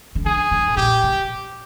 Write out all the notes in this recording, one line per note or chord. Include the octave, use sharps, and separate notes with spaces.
C#3
D3 G#4
D3
A2
A#2 G4
C3